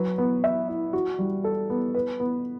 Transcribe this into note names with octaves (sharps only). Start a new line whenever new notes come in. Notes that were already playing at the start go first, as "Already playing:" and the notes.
Already playing: F#3 B4
B3
E5
E4
F#4
G3
A4
B3
B4
B3